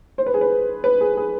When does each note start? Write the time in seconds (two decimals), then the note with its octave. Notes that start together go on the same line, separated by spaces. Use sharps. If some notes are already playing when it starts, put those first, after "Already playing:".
0.18 C5
0.26 B4
0.34 G#4
0.41 B4
0.84 B4
1.01 G#4
1.17 G#4